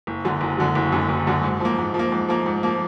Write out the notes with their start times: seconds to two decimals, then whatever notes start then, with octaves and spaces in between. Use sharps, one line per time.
0.07 F#1
0.25 F#2 D3 F#3
0.41 F#1
0.58 F#2 D3 F#3
0.75 F#1
0.92 F#2 D3 F#3
1.09 F#1
1.27 F#2 D3 F#3
1.43 G#2
1.60 F3 A#3
1.78 G#2
1.94 F3
1.99 A#3
2.12 G#2
2.29 F3 A#3
2.46 G#2
2.63 F3 A#3